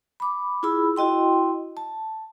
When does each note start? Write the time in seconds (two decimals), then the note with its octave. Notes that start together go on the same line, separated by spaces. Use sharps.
0.20 B5 D6
0.63 E4 F4 G#4 B5 E6
0.96 E4 F#4 D#5 G5 C6
1.77 A5